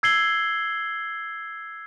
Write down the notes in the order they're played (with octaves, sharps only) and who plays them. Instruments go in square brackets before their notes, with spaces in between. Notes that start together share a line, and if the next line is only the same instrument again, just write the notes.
[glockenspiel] E6 G#6 C7 F#7 G7